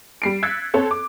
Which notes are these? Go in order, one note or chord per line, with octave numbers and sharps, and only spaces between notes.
G3 C7 D7
E6 F#6 G#6 A6 B6 C#7
C4 A4 C#5
D6